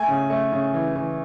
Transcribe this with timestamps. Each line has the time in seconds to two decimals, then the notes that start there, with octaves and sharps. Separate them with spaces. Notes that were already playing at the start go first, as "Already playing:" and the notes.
Already playing: A3 G#5
0.08 C#3
0.30 A3
0.52 C#3
0.74 E3
0.96 E3